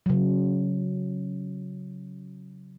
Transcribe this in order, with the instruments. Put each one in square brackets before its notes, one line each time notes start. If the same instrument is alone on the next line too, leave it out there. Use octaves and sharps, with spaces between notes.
[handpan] C#3 F#3